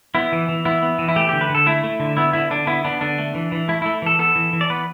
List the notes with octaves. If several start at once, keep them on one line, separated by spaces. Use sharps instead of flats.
B3 E4
E3
E3
B3 E4
B3
E3
E4
A3 G4
D3 G4
B4
D3 A4
A3 E4
A3
D3
B3 E4
D3 E4
D3 D4
B3 E4
B3 D4
D3 D4
A3
E3
E3
A3 E4
A3 E4
E3 A4
B3 A4
E3
E3
D5
B3 B4